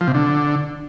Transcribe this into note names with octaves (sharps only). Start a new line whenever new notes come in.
F3
C3
D3